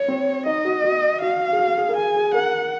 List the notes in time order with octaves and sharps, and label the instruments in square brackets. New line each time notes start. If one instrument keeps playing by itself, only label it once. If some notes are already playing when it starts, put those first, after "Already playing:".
Already playing: [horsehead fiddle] C#5
[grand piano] C4
[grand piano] D#4 [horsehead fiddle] D#5
[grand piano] F#4
F#4
[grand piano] F#4 [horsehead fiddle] F5
[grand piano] G#4
F#4
G#4
A#4
[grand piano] G#4 [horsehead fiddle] G#5
[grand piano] G#4
[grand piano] A#4 [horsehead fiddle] F#5